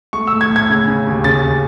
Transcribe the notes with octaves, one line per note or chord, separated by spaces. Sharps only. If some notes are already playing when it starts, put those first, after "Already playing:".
A3 C#6
E6
A2
G#6
A2
G#6
C#3
C#3
D#2
C#3 A6